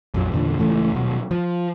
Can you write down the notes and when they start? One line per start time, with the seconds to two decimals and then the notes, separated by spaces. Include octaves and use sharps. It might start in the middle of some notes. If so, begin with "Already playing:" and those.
0.14 A#1 F2 F#3
0.32 E2 A#2 D3
0.58 C#2 A2 E3 A3
0.93 D#1 B2 F#3
1.31 F3